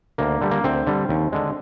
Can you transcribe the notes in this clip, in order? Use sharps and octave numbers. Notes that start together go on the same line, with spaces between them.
D2 A#3
D3 G3
A#3
D2 C4
D3 G3
D#2
D3 G#3